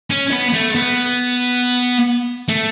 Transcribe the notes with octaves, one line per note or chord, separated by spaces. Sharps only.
C#4
B3
A3
B3
A3